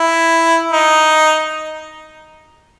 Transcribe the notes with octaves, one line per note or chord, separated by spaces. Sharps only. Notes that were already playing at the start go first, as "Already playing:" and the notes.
Already playing: E4
D#4